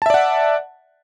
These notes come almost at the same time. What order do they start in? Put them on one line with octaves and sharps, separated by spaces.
A5 E5 D5 F#5